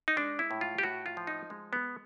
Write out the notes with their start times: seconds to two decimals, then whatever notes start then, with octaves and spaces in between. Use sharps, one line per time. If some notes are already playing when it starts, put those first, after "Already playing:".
0.08 D#4
0.17 G#3 D4
0.39 E4
0.51 A2
0.61 F4
0.78 G4
0.83 A2 F#4
1.06 F4
1.17 F3
1.27 D#4
1.50 G#3
1.73 B3